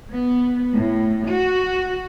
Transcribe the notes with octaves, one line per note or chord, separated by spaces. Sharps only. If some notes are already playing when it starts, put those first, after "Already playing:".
B3
A2
F#4